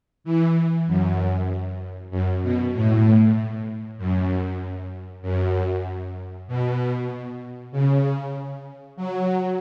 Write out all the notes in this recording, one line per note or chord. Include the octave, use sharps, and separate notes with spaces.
E3
F#2
F#2
B2
A2
F#2
F#2
B2
C#3
F#3